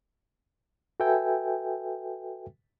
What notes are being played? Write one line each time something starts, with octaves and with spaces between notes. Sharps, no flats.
F#4 A4 B4 E5 G5 G#5